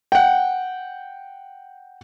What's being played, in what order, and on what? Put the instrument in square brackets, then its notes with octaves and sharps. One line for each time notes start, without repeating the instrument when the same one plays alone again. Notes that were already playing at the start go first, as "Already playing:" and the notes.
[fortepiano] F#5 G5